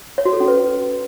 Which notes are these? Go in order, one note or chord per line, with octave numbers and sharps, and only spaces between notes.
C#5
F#4
A4
C#4
B4